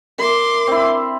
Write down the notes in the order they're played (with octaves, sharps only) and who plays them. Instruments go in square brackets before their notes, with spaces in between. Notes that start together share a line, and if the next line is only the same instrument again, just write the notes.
[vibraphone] A#4 E5 [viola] C6 D6
[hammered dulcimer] C4 E4